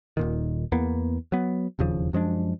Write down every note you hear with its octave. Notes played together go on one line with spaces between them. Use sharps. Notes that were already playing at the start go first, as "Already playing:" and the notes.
D#1 A#2 D#3
E2 A#3 B3
F#3 B3
E1 D#2 C#3 F3
F#2 F3 G#3 D4